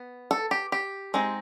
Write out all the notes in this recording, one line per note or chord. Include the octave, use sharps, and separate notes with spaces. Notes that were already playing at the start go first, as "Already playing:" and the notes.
Already playing: B3
A4
G4
G4
G#3 C4 D#4